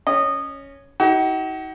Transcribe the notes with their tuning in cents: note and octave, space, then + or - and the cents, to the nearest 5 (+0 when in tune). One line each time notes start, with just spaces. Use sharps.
C#4 +0 D#5 -20
D#4 +40 F#4 +45